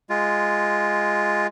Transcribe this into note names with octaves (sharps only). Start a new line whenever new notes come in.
G#3 F4